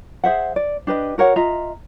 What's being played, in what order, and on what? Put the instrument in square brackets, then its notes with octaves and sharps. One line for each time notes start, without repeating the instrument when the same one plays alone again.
[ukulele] G#4 C5 E5 F#5
D5
D4 G4 B4 D#5
F#4 A#4 C#5 F#5
F4 D#5 E5 A#5